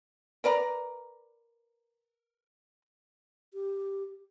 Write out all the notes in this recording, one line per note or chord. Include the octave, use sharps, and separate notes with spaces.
A#4 B4 D5 A#5
G4